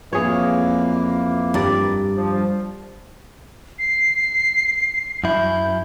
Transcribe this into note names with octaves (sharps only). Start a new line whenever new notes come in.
F2 E3 A#3 G#4 C#5
G2 A#4 D5
F3
C7
F#2 E4 G6